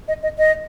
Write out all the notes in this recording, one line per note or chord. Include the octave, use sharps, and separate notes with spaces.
D#5
D#5
D#5